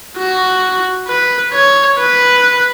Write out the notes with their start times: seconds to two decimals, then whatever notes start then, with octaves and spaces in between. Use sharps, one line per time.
0.17 F#4
1.08 B4
1.54 C#5
1.99 B4